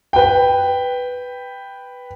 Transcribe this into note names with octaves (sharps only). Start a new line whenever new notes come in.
B4 G5